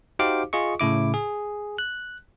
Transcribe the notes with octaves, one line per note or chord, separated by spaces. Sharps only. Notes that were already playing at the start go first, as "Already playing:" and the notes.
D#4 F#4 G4 C5 F5 D6
F4 G#4 D#5 C#6
A2 C#3 E4 D6
G#4
F#6